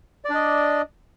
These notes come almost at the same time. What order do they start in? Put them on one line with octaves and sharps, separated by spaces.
D5 D4 D#5